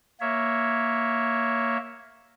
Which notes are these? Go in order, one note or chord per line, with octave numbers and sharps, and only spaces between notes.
A#3 C#5 E5